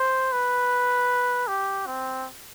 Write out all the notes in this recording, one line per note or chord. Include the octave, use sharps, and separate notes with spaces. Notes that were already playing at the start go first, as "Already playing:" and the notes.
Already playing: C5
B4
G4
C4